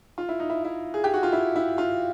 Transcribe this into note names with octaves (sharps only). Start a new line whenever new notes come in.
F4
E4
D#4
E4
E4
G#4
G4
F#4
F4
E4
E4
F4